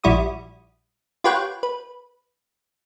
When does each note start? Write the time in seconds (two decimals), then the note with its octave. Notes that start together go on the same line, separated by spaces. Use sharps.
0.04 A#1 G3 E4 F#4 D#6
1.24 F4 G4 B4 C#5 F#5 G5
1.63 B4